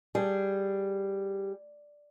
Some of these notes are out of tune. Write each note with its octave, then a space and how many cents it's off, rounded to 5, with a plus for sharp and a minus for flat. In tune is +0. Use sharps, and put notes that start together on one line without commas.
G3 +0 G#4 +0